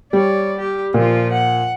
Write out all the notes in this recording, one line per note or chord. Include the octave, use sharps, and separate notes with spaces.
G3 C#5 D5
G4
A#2 F3 F4
F#5